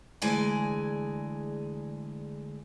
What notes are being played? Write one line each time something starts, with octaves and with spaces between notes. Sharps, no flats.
D2 E3 G#3 G#4 D5 G#5